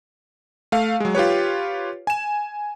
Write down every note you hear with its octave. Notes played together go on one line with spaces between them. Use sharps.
A3 F5
F#3 G#3
F4 G4 B4 C#5
G#5 E7